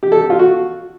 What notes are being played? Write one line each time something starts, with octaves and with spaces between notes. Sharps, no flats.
G4
A4
G4
F4
F#4